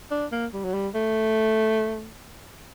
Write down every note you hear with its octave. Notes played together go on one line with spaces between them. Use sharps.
D4
A#3
G3
F#3
G3
A3